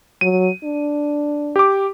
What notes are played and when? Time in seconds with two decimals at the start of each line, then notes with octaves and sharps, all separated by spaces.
0.21 F#3 D#7
0.64 D4
1.56 G4 D6